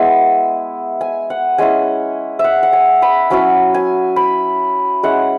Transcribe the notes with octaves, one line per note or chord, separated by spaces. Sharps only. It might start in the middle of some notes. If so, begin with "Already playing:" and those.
Already playing: G#3 B3 E4 G#5
G#5
F#5
G#3 C#4 E4 G#5
E5
F#5
F#5
G#5
B5
F#3 C#4 E4 G#5
G#5
B5
G#3 C#4 E4 F#5